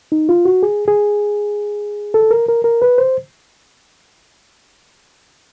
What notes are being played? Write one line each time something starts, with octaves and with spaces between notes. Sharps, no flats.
D#4
F4
F#4
G#4
G#4
A4
A#4
A#4
A#4
B4
C5